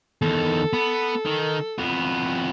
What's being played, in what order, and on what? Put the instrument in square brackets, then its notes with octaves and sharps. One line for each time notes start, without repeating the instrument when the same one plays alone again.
[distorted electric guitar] E2 D#3 [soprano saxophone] A4
[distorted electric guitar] B3
D#3
F2 B3